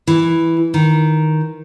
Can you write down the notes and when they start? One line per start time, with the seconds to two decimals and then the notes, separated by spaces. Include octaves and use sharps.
0.07 E3
0.74 D#3